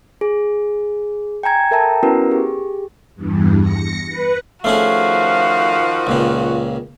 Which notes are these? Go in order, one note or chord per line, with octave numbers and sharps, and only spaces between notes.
G#4
G5 G#5 A#5 G#6
A4 A#4 E5 G5 A5 A#5
B3 C#4 E4 F#4 A#4 B4
G4 G#4
E2 G2
A#6 C#7
B4
D#3 F3 A3 C#4 F#4 G#4 F5
C#2 A#2 C#3